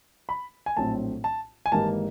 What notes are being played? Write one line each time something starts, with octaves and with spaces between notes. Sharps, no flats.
B5
G#5
A#1 A2 F#3 A3 C4 A5
A5
G#5
G#1 G#2 E3 G3 A#3 A5